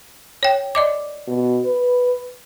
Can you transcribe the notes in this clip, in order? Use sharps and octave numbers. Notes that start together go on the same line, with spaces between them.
C#5 G5
D5 D#5 D6
B2
B4